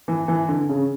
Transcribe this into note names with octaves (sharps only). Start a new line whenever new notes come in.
E3
E3
D3
C#3